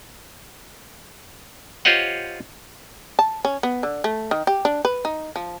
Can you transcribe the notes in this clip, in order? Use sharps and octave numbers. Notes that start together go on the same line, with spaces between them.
F4 G4 C5 C#5 D#5 F#5
A5
C#4
B3
D3
A3
D#3
G4
D4
B4
D#4
F3